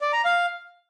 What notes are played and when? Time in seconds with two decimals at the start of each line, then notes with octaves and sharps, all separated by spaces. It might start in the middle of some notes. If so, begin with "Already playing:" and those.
0.01 D5
0.13 A#5
0.25 F5